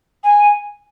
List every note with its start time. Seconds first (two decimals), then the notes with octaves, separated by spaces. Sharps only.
0.24 G#5